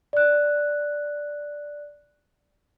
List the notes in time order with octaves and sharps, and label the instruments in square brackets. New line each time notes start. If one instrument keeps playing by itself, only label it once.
[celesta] D5 F#6